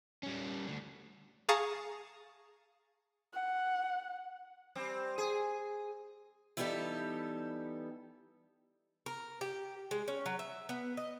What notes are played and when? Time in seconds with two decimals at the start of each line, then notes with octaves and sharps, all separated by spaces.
0.23 G3 C#4
0.67 D2 D3
1.49 G#4 F5 A5 A#5 C#6 D#6
3.33 F#5
4.75 G3 C4
5.18 G#4
6.57 E3 G3 B3 D#4 G4 A4
9.06 A#4
9.41 G4
9.91 G#3
10.08 C#4
10.26 F#3
10.39 E5
10.69 B3
10.97 D#5